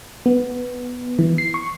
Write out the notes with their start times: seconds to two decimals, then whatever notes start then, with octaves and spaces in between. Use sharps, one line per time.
0.26 B3
1.19 E3
1.38 C7
1.54 C#6